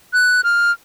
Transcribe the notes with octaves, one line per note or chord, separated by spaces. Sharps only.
F#6
F6